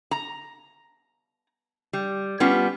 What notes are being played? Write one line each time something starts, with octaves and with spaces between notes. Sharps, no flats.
A#5
G3
G3 B3 C#4 F4